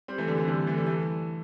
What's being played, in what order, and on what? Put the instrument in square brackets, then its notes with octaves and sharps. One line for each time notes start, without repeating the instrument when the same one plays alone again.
[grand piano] G3 C4
E3 A3
D3 G3
C3 E3
D3 G3
E3 A3
G3
E3 A3